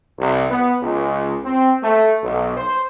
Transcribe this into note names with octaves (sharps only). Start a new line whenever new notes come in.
C2
B3
C#2
C4
A3
B1
C5